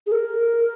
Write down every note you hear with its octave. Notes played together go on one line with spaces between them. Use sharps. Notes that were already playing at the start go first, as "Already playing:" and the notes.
G#4
A#4